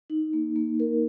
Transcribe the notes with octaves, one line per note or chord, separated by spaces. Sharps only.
D#4
A#3
A#3
A#4